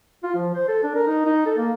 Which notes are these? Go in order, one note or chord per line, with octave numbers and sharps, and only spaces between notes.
F4
F3
C5
A4
D4
A#4
D#4
D#4
A4
A#3